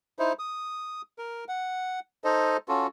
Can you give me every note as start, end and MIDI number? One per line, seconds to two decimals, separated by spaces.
0.19 0.33 63
0.19 0.33 64
0.19 0.33 72
0.39 1.02 87
1.19 1.44 70
1.49 2.00 78
2.24 2.57 63
2.24 2.57 69
2.24 2.57 72
2.24 2.57 75
2.68 2.87 61
2.68 2.87 65
2.68 2.87 66
2.68 2.87 69